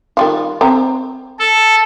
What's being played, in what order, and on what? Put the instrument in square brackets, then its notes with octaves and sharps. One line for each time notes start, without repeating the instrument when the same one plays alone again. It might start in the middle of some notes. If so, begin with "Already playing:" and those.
[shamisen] D#3 G3 F4
C4 A#5
[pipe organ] A4